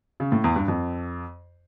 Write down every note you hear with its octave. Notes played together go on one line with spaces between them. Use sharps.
C#3
A2
E2
G2
F2